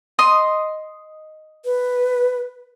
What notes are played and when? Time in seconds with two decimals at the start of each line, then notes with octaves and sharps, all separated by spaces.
0.19 D#5 C6 D#6
1.65 B4